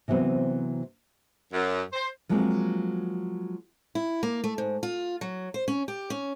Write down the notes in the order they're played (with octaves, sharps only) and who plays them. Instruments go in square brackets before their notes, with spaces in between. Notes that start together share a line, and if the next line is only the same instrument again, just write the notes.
[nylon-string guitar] C3 E3 F#3 B3 C4
[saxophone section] F#2
C5
[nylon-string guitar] F3 F#3 G#3 A#3 C4
[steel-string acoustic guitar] E4
A#3
A3
G#2
F4
F#3
C5
C#4
G4
C#4